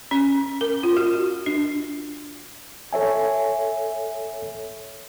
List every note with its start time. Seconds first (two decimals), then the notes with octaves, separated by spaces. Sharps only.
0.11 C#4
0.61 A#4
0.83 F4
0.97 F#4
1.46 D4
2.93 A4 C#5 E5 G#5